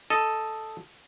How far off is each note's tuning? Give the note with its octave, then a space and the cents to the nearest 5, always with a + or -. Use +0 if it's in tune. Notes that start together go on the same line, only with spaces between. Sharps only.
A4 +0 D#5 +0